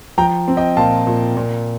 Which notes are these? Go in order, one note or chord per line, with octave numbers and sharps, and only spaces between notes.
F3 G5 A#5
C4
D#5 G5
A#2 F5 A5
A#2
A#2